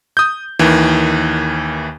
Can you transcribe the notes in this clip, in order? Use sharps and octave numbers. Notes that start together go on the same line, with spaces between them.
D#6 G6
D#2 D#3 E3